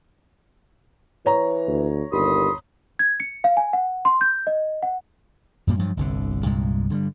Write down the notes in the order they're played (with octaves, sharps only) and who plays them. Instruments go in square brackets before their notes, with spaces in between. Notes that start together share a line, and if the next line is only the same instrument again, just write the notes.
[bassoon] E3 [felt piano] C#5 A#5
[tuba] D2
[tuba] G1 [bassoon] D#2 [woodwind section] B5 C6 D#6
[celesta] G#6
C#7
F5
G#5
F#5
C6
G6
D#5
F#5
[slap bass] F#2 A#2 G3 A#3
G2 F3 F#3
G1 C2 D3
C2 G2 A#2 G#3
G2 D3 E3 G3